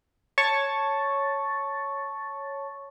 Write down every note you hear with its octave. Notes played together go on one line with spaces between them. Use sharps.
C#5 A5 C#6 A6